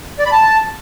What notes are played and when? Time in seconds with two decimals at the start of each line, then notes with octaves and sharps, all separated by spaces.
0.19 D5
0.26 B5
0.32 A5